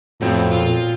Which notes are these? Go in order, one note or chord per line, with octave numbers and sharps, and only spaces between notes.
F2 A2 F#3 B3 C4
A#2 F4